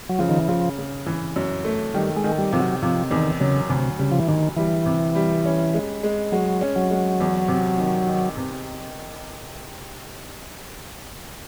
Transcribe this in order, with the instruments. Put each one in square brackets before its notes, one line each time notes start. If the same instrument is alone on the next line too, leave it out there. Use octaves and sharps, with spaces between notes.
[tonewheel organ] F#3
[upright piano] C#3 [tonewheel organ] F3
[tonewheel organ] D#3
E3
[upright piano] C#3 [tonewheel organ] F3
[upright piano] C#3
E3
F#2
A3
[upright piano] D#3 [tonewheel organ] G3
[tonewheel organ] G#3
[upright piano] D#3
[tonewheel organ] G3
[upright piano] C3 [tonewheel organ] F3
[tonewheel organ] F#3
[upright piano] C3 [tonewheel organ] F3
[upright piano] E2 [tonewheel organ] D#3
[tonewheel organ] C#3 [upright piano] F#3
[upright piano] D2 [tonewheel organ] C3
[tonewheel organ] C#3 [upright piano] G3
[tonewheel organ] F3
E3
[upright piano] D2 [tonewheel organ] D#3
[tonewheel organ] E3 [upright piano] G3
[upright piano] C3
G3
C#4
G#3
G#3
[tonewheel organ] F#3 [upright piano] G#3
[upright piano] C#4
[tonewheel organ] F#3
[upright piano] G#3
E2
C3
D#3
D#3
C3